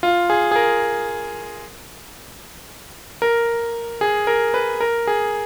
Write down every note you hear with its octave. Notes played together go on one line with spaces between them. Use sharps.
F4
G#4
G#4
A#4
A#4
G#4
A#4
B4
A#4
G#4